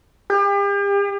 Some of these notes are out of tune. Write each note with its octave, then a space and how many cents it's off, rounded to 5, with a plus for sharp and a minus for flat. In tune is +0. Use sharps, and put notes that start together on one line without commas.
G4 +40